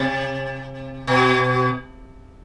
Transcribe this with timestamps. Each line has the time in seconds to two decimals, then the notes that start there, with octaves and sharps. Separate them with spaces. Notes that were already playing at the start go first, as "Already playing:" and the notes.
Already playing: C3
1.07 B2